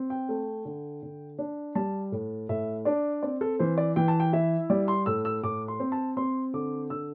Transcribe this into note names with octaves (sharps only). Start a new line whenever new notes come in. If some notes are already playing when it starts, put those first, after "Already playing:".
Already playing: C4
G5
A3
D3
D3
D4
G3 A5
A2
A2 E5
D4 D5
C4 D5
A4
E3 C5
D5
E3 G5
A5
G5
E4 E5
G3 D5
C6
A2 E6
E6
A2 D6
C6
C4
A5
C4 C6
D3 D6
D3 E6